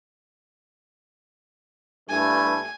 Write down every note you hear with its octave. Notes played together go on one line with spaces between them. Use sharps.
G2 E3 A3 G#5